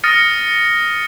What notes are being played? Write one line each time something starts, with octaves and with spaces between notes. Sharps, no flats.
D#6 F6 A6 A#6 C#7 D#7